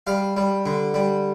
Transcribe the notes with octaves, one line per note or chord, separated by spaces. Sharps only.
G3 F5
G3
D3
G3